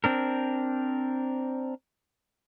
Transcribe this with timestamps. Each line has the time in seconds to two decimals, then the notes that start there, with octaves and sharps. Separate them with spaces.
0.04 C4 D4 A#4